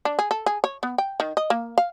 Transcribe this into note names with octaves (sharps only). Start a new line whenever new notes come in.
D4
G#4
A4
G#4
C#5
B3
G5
D#3
D#5
A#3
F5